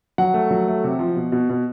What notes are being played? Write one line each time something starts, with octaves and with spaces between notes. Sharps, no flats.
F#3 F#5
A3
F#3
A3
C3
F3
B2
B2
B2